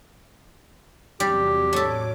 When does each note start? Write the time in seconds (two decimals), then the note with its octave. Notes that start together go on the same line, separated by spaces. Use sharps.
1.20 E2 C3 F#3 G3 G4
1.73 A2 F#3 A3 A4 C#5 D6